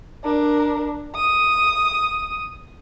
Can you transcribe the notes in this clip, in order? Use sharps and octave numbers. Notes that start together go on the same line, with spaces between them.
D4 A#4
D#6